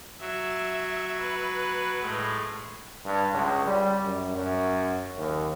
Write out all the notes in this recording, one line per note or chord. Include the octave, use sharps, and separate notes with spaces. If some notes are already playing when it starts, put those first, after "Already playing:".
F#3 E5
B4
A2 G#3
G2
C#2
G3
F#2
F#2
D#2